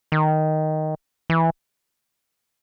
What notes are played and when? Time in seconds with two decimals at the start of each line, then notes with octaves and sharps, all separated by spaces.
0.12 D#3
1.30 E3